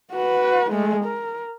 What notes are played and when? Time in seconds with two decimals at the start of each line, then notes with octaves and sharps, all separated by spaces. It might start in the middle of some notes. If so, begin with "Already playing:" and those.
0.12 F#4 B4
0.71 G#3 A3
1.04 A#4